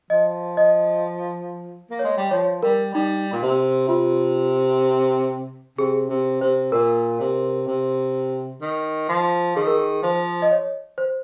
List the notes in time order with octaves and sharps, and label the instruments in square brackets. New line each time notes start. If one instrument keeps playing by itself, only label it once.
[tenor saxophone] F3 [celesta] D#5
[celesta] D#5
[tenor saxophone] A#3
[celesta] C#5
[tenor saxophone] G#3
G3
[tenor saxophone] F3 [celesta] C#5
[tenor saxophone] G3 [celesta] A#4
[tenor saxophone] G3 [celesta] D#4
[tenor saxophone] A#2
C3
[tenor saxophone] C3 [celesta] F4
[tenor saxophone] C3 [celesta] G#4
[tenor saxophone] C3
[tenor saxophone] C3 [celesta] C5
[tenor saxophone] A#2 [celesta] A#4
[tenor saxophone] C3
C3
D#3
F3
[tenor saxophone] D#3 [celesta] G#4
[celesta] A#4
G#4
[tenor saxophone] F3 [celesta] C5
[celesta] D#5
C#5
C5